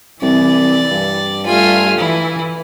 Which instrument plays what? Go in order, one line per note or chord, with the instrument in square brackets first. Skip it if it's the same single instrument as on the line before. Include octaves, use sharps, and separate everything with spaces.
[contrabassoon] C2 [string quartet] E3 [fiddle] D5
[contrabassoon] G2
[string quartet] G3 A3 F4 [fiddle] G#5 F6
[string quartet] E3 [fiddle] E4